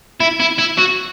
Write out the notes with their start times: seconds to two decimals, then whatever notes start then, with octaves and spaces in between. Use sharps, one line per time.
0.21 E4
0.40 E4
0.59 E4
0.78 F#4